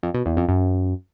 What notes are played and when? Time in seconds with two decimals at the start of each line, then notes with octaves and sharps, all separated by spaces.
0.03 F2
0.14 B2
0.26 E2
0.37 F2
0.49 F#2